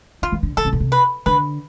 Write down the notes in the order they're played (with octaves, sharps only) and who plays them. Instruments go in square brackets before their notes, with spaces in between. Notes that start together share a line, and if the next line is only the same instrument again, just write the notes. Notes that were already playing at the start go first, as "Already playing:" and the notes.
[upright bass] D3 [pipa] F4
[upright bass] E3
D3
[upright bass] D3 [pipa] A4
[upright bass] C3
B2
C3
[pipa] B4
[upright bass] D3 [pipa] B4